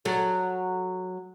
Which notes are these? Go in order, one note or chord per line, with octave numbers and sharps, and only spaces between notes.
F#3 A4